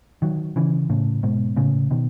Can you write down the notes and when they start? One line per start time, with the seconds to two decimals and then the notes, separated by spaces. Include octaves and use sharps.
0.22 D#3 F#3
0.56 C#3 E3
0.90 A2 C#3
1.23 G#2 B2
1.56 A2 C#3
1.91 B2 D#3